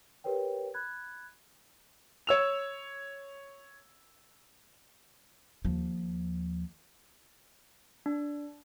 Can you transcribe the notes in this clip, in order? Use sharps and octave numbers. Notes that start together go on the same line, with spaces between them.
G4 A#4 B4 C#5 G5
B5 F#6 G#6
C#5 E6 F7
D#2 F3
D4